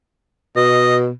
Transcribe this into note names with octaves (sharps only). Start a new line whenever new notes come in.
B2 D#5